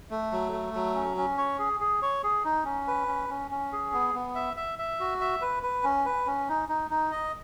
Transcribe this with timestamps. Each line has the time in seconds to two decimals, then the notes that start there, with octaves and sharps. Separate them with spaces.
0.11 A3
0.32 F#3
0.52 A3
0.74 F#3
0.95 C#4
1.17 C#4
1.38 C#5
1.59 G#4
1.80 G#4
2.02 C#5
2.24 G#4
2.44 D#4
2.65 C#4
2.87 B4
3.08 C#4
3.30 C#4
3.51 C#4
3.72 G#4
3.93 B3
4.15 B3
4.35 E5
4.57 E5
4.79 E5
5.00 F#4
5.21 E5
5.42 B4
5.63 B4
5.84 C#4
6.06 B4
6.27 C#4
6.49 D#4
6.69 D#4
6.91 D#4
7.11 D#5